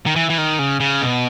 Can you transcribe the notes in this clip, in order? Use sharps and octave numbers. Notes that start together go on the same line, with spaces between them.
D#3
E3
E3
D#3
C#3
C#3
B2